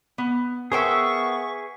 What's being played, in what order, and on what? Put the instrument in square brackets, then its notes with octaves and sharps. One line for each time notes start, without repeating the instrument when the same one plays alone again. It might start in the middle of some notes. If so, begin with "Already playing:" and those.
[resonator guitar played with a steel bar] B3
[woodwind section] B3 F#5 C#6 [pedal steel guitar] G#4 E5 [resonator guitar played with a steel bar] A#4 C5 G5